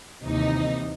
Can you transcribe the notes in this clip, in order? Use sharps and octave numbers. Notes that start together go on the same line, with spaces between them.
D#2 C3 E3 D#4